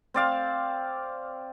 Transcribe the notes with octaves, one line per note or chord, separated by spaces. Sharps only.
C4 D5 F5